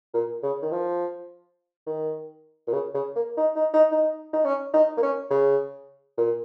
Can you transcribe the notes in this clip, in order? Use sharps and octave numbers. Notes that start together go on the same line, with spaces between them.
A#2
C#3
D#3
F3
D#3
A#2
C#3
C#3
A#3
D#4
D#4
D#4
D#4
D#4
C#4
D#4
A#3
C#4
C#3
A#2